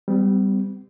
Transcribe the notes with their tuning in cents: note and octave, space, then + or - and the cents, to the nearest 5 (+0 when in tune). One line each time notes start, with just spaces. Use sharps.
G3 +0 B3 +45